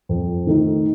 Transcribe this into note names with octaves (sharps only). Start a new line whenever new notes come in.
F2
D#3 A3 D#4